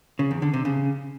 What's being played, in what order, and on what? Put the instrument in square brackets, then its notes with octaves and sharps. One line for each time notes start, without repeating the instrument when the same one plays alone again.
[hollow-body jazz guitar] C#3
E2
D3
C3
C#3